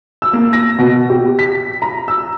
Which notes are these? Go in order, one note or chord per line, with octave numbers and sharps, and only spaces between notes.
E6
A#3
A#6
B2
G4
B6
A#5
E6